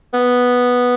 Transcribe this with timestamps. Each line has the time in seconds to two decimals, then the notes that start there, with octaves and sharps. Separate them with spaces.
0.14 B3